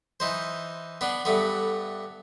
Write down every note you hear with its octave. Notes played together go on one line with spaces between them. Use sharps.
E3 D#4 C5
B3 D4
G2 A3 B3